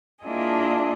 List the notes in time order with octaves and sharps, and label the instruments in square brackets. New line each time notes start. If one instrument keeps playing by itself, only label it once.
[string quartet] A#3 D4 E4 F4 G#4 D#5